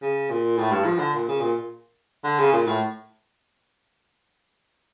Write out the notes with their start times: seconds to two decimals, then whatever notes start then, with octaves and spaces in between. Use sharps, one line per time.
0.02 C#3
0.30 A#2
0.58 A2
0.72 G2
0.85 F3
0.99 D3
1.14 A#2
1.28 C#3
1.41 A#2
2.24 D3
2.39 C#3
2.52 A#2
2.67 A2